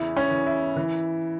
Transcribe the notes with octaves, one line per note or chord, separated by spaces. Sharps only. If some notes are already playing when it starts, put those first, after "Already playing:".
Already playing: E2 C#3 E3 E4
C#4
E3
E4
E3